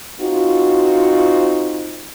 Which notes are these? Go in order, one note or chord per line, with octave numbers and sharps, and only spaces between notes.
C4 D#4 F4 F#4